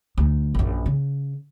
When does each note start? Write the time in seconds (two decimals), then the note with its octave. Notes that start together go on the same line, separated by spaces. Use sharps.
0.18 D2
0.55 A#1 F#2
0.86 C#3